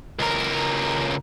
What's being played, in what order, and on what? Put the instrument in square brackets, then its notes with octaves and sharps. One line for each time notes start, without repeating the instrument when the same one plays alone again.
[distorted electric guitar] C#2 A#4